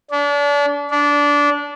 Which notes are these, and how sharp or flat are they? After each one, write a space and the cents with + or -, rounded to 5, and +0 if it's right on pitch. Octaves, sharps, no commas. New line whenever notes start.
D4 -35
D4 -20